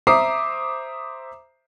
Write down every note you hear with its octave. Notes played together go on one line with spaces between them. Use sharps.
C5 E5 A#5 D6 D#6 C7